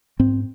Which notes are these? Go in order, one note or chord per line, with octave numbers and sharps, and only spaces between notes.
G#2 C4